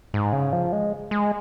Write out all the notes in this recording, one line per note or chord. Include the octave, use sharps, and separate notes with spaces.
G#2
C#3
F3
G#3
G#3